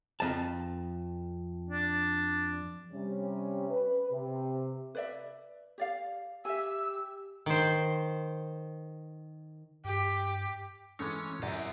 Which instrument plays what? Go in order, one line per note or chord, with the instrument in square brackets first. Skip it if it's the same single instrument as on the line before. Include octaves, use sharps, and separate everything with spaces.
[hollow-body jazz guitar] F2 A5
[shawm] D4
[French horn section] C3 G3 C#4
B4
C3
[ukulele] B4 D5 E5
G4 D5 F5
[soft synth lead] G4 [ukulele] E5 G#5 [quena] E6
[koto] D#3 C5
[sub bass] G2 [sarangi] G4
[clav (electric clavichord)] E3 G#3 A3 [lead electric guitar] C#4
[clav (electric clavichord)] F#2 G4 D#5 [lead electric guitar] E4 D5